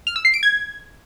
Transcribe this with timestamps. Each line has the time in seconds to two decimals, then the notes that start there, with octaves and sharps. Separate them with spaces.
0.07 F6
0.16 E6
0.25 C7
0.34 D7
0.43 G#6